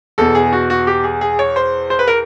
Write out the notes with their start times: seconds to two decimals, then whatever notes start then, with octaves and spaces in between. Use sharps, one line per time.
0.18 E2 B2 A4
0.35 G#4
0.52 F#4
0.70 F#4
0.87 G4
1.04 G#4
1.21 G#4
1.39 C#5
1.56 C5
1.90 C5
1.99 B4
2.08 A#4